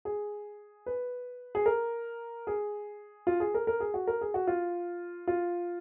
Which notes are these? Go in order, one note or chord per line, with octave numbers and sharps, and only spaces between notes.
G#4
B4
G#4
A#4
G#4
F4
G#4
A#4
A#4
G#4
F#4
A#4
G#4
F#4
F4
F4